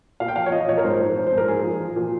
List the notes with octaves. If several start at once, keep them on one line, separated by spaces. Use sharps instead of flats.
A#2 F5
G5
F3 F5
C#5
F3 D#5
A#2 C#5
A#4
G#2 C5
F3
F3 C5
C5
G#2
A#4
A#2 G#4
F3
F3
A#2